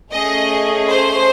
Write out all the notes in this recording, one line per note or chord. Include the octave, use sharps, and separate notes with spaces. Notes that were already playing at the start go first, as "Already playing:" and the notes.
A3 C#4 G#4 D#5
C5